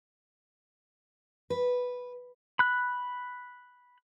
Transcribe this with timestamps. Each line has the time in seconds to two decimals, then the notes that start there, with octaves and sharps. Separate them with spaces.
1.50 B4
2.59 B5 F#6